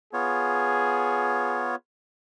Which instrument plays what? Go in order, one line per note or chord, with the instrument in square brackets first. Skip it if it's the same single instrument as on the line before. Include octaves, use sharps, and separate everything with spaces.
[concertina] B3 F4 C#5 [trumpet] G#4